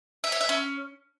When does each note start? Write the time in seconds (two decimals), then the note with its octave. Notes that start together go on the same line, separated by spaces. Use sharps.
0.24 E5
0.32 C#5
0.41 E5
0.49 C#4